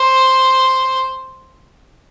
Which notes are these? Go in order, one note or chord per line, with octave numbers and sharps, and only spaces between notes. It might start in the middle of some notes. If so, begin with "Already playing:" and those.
Already playing: C5